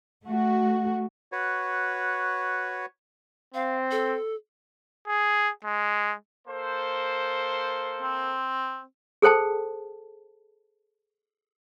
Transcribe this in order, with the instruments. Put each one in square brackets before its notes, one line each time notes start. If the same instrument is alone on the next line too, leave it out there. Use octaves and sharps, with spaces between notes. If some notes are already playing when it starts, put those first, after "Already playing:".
[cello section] A3 F#4
[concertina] F#4 B4 C#5
[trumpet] C4 [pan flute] F5
[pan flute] A4
[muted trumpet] G#4
G#3
[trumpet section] A#3 A4 C5
[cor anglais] C4
[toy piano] G#4 A4 C5 G5 A5